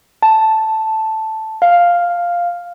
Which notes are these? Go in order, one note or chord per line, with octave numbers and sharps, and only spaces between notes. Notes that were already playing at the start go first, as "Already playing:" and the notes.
A5
F5